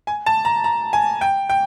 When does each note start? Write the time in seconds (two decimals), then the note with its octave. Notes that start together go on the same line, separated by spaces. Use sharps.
0.07 G#5
0.26 A5
0.45 A#5
0.64 A#5
0.93 G#5
1.21 G5
1.50 G5